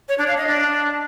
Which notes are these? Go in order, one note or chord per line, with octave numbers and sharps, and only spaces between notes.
C#5
D4
F5
D#5
D4